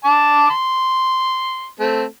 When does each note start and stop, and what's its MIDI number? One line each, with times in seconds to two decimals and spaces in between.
0.04 0.50 81
0.04 0.50 86
0.50 1.68 84
1.80 2.05 57
1.80 2.05 60